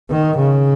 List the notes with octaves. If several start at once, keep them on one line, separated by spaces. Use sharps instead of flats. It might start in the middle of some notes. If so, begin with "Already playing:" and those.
D#3
C#3